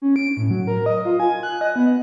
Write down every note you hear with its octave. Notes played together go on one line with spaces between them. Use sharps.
C#4
D7
A2
F#3
A#4
D#5
F4
G#5
F#6
D#5
B3